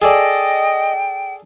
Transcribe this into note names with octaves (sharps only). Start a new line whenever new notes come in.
G#4 A4 D5 D#5 G5